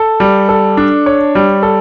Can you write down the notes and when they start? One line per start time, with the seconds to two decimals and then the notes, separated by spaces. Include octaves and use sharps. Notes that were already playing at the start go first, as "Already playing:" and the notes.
Already playing: A4
0.20 G3
0.49 A4
0.77 D4
1.06 C#5
1.35 G3
1.63 A4